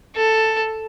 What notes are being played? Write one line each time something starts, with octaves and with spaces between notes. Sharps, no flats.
A4